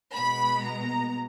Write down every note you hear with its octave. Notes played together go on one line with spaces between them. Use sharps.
B2 G#3 B3 B5
A#5